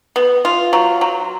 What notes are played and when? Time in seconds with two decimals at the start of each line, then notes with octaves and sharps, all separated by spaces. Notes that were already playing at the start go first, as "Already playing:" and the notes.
0.16 B3
0.45 F4
0.73 F#3
1.01 F#3